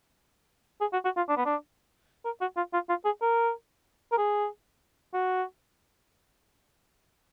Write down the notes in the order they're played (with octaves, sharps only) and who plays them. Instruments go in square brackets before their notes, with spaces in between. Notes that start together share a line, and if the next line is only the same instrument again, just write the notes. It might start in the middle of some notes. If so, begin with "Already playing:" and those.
[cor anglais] G#4
F#4
F#4
F4
D4
B3
D4
A#4
F#4
F4
F4
F4
G#4
A#4
A#4
G#4
F#4